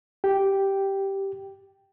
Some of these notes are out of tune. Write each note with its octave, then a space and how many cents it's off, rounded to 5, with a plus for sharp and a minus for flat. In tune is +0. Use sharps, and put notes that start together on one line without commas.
G4 -5 G5 -5